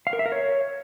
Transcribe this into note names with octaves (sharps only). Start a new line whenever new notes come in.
F5
A#4
E5
A#4
C#5